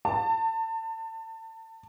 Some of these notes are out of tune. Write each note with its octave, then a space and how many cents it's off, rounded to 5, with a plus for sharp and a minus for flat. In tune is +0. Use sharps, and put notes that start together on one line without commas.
A5 +30